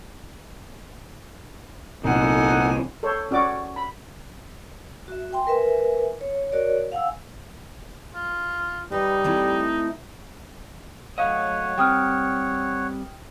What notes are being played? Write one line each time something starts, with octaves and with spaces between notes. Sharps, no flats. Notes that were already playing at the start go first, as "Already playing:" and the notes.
C2 A#2 D#4 A4 F#5 G#5
A4 C5 C#5
C#4 F#4 D5 D6
B5
F#4 E5
G5 G#5 C6
A#4 B4 E5 G#5
C#5
F#4 A#4 C#5 D5
F5 F#5 G#5 E6
F4
G3 D#4 B4
A3 C4 E4
F#3 A3 C#5 D#5 F5 F#5
G3 C4 G5 D#6 F6